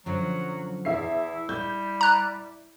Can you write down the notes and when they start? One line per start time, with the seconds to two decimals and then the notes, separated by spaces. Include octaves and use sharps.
0.06 F#2 D3 F3 F#3
0.85 E2 E4 E5 C7
1.49 G3 E4 G6
2.01 A#5 F#6